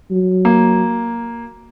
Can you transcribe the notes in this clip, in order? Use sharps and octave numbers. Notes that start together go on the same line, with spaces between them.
F#3
A#3